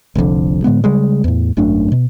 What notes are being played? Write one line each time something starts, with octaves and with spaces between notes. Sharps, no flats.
F1 C2 F2 D3
A2 D3 G#3 B3
C#3 G3 G#3
E2 A2
G#1 F#2 A3 D4
B2